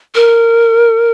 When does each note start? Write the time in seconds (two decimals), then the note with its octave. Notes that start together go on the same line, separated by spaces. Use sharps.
0.15 A#4